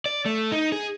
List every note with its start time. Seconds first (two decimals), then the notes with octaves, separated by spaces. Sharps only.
0.06 D5
0.26 A3
0.52 D#4
0.72 G#4